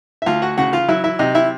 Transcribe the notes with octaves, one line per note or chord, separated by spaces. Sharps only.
E5
D2 F4 F5
F#4 F#5
C#3 F#4 F#5
F4 F5
F#3 E4 E5
E4 E5
C3 D#4 D#5
E4 E5